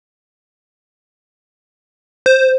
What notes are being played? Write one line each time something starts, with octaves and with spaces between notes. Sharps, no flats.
C5